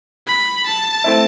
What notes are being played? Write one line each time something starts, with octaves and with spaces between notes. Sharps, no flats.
B5
A5
A3 C4 E4